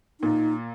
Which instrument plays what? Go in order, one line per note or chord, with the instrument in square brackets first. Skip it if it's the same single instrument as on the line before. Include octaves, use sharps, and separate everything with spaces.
[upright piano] A#2 [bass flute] D#4